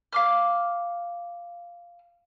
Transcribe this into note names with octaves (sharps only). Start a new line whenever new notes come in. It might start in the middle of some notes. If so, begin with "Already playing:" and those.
F5 D6 F6